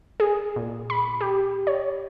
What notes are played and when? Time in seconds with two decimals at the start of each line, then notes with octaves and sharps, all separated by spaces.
0.20 G#4
0.56 A#2
0.90 B5
1.21 G4
1.67 C#5